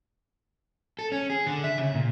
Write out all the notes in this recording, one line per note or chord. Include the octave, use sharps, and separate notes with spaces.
A4
C#4
G#4
D3
E5
C#3
A#2